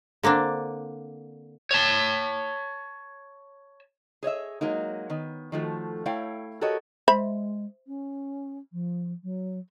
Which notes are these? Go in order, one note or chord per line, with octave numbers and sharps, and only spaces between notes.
D3 A#3 C4 D4
C#5 A5
G#4 C#5 D#5 E5
F#3 G#3 A#3 D#4
D#3 B3
D#3 F3 A3 F#4
A3 E4 C#5 F5 G5
F#4 G4 A4 A#4 C#5 D#5
G#3 C5 E5 B5
C#4
F3
F#3